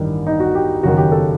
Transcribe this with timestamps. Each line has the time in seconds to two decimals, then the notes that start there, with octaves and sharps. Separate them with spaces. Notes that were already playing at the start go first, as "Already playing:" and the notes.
Already playing: A1 G2 D#3 D4
0.27 D#4
0.40 F#4
0.55 G4
0.83 F#1 F#2 D#3 F#4
0.97 G4
1.12 A4